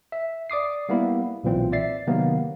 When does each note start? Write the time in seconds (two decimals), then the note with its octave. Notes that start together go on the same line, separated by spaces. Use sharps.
0.12 E5
0.50 D5 D6 D#6 C7
0.89 G3 A#3 B3 E4
1.44 B1 A#2 E3 C4
1.72 D5 E5 A6 C7
2.07 C3 D#3 F#3 A#3 B3